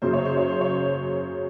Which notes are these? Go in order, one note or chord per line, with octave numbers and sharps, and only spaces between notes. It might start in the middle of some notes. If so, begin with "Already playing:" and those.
F#2 C#3 F#3 C5
C#5
C5
C#5
C5
C#5